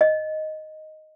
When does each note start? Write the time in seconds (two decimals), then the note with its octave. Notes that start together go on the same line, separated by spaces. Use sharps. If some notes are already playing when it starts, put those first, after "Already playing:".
0.01 D#5